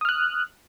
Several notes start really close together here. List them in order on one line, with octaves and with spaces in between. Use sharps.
D#6 F6 F#6